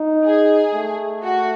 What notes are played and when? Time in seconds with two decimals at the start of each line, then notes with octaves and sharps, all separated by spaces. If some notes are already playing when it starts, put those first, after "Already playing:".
Already playing: D#4
0.26 G#4
0.74 A3
1.23 F#4